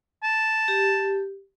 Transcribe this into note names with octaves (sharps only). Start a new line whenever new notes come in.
A5
G4